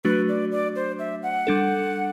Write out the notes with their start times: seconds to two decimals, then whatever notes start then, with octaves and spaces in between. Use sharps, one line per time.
0.05 F#3 A3 D4 F#4 B4
0.28 D5
0.52 D5
0.76 C5
0.99 E5
1.23 F#5
1.47 G3 D4 A4